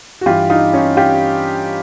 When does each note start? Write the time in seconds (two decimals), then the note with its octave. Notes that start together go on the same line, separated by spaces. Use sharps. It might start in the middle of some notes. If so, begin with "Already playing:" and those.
0.21 F#4
0.26 G2 E3 F4 G4
0.50 D#4 F4
0.73 C#4 D#4
0.97 F4 G4